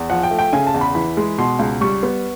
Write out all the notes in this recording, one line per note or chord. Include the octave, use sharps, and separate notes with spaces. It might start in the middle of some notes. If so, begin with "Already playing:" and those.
Already playing: E2
F3 F#5
G5
A3
G5
C#3 G#5
A5
E2
B5
E3 B5
G#3
B2 C6
C#2
G3 C#6
B3